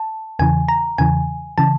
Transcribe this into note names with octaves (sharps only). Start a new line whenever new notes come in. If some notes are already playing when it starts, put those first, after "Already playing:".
Already playing: A5
E2 C#3 E3 G#5
A#5
E2 C#3 E3 G#5
C#3 E3 A5